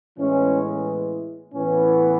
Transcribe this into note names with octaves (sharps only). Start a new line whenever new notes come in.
A2 E3 G#3 B3 C#4
A2 E3 B3 C#4